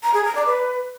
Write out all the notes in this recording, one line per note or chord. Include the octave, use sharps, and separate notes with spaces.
A#5
G#4
A#5
D5
B4